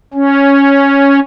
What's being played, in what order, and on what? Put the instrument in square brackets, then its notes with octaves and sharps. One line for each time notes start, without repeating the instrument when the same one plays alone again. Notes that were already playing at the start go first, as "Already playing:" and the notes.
[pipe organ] C#4